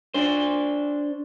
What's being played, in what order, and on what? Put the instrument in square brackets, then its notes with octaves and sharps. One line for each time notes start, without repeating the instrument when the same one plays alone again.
[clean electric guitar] D4 C5